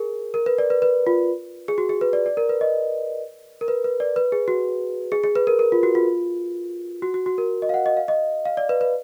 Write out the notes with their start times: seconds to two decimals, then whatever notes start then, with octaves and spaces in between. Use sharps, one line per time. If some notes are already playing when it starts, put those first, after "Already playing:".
Already playing: G#4 A#4
0.34 A#4
0.46 B4
0.58 D5
0.70 B4
0.82 B4
1.07 F4
1.68 G#4
1.78 F#4
1.89 G#4
2.01 B4
2.13 D5
2.26 D5
2.37 A#4
2.49 B4
2.61 D#5
3.61 A#4
3.68 B4
3.84 B4
4.00 D5
4.16 B4
4.32 G#4
4.48 F#4
5.12 G#4
5.24 G#4
5.35 B4
5.47 A#4
5.59 A#4
5.72 F4
5.83 F#4
5.95 F4
7.02 F#4
7.14 F#4
7.26 F#4
7.38 A#4
7.62 D#5
7.69 F5
7.74 F#5
7.86 D#5
7.97 F5
8.08 D#5
8.45 F5
8.57 D5
8.69 B4
8.81 B4